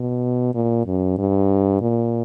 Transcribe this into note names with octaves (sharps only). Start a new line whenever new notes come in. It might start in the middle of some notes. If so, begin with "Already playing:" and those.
Already playing: B2
A#2
F#2
G2
A#2